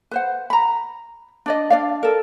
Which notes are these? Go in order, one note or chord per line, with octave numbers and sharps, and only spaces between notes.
B4 C5 F#5
A#5 B5
D4 D5 D#5
D4 D5 F5
A4 A#4